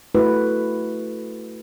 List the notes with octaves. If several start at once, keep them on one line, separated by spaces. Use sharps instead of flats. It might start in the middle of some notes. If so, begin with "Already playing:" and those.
A3 E4 F#4 B4